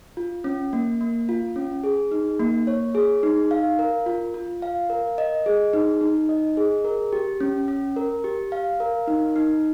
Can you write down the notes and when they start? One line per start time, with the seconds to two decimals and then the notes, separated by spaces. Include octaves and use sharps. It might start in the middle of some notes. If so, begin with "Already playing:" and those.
0.17 F4
0.44 C#4
0.73 A#3
1.01 A#3
1.29 F4
1.56 C#4
1.84 G#4
2.11 D#4
2.40 A#3
2.67 C#5
2.95 G#4
3.23 D#4
3.51 F5
3.79 A#4
4.06 F4
4.34 F4
4.62 F5
4.90 A#4
5.18 D#5
5.46 G#4
5.73 D#4
6.01 D#4
6.29 D#5
6.57 G#4
6.85 A#4
7.13 G4
7.41 C#4
7.68 C#4
7.96 A#4
8.24 G4
8.52 F5
8.80 A#4
9.08 D#4
9.36 D#4